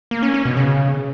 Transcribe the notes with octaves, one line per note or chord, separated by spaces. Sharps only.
A#3
C#4
C#4
B2
C#3